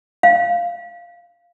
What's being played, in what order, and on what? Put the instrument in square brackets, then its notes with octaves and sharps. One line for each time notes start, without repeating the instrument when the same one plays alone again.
[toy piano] F5